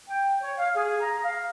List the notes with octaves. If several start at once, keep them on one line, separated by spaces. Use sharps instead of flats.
G5
C#5
F5
G#4
A#5
F5